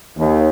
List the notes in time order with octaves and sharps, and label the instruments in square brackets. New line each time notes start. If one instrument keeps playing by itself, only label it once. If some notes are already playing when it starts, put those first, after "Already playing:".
[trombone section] D#2